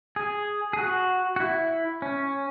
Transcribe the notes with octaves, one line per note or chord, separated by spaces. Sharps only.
G#4
G#4
F#4
F#4
E4
C#4